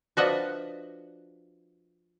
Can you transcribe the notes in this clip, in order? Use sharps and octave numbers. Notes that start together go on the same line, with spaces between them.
F3 D4 F#4 B4 D#5 E5